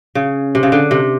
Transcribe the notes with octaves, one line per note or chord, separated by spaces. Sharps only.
C#3
C3
C#3
D3
C3